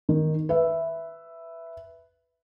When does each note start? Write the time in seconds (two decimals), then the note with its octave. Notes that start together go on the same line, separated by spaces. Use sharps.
0.09 D#3
0.49 B4 E5